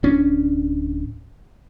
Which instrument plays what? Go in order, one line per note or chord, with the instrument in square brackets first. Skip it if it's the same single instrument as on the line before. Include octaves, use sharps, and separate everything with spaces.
[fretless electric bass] D1 C#4 D4